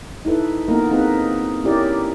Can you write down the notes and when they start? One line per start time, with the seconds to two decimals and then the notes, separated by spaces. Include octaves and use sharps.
0.25 D#4 E4 A4 B4
0.68 A#3 B3 D#4 F4 A#4
0.91 C4 D#4 G#4 A#4 B4
1.64 C#4 E4 G4 A#4 D5